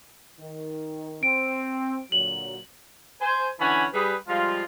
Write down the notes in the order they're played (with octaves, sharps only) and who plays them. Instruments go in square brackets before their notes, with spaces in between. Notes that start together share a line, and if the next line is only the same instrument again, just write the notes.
[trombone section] D#3
[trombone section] C4 [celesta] D7
[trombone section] A#2 D3 F#3 [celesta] F#7
[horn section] C5 G#5
D3 E3 C#4 F#5 G#5 B5
G3 G#4 B4
F3 G3 G#3 F4